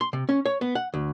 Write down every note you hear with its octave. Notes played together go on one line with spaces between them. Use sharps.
C6
C3
C#4
C#5
B3
F#5
D2